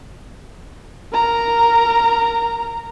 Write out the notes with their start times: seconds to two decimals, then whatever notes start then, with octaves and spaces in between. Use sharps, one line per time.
1.13 A#4 A#5